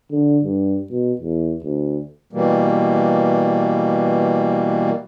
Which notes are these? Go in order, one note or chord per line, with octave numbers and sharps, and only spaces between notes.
D3
G2
B2
E2
D2
B2 E3 G3 A#3